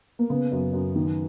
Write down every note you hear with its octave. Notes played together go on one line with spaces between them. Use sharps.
A#3
C#3 B3
F#2
F#2
D#3